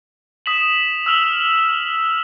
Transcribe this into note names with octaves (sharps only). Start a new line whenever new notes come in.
D#6 B6 E7 F#7
E6 F6 F7 F#7